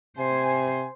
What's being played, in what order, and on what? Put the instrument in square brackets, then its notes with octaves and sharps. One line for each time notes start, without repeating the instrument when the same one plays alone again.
[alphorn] C3 [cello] C5 [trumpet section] G#5